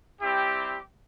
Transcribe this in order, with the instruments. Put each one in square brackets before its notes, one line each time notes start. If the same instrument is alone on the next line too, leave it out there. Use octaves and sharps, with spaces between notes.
[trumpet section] G3 C4 E4 G4